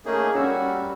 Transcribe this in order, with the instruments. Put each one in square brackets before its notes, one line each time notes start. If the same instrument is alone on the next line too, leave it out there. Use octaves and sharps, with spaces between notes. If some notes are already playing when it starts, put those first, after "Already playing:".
[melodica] A3 C#4 D#4 [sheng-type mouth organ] A#3 G#4
[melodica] G3 [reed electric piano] C#4 E6 [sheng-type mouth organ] F#4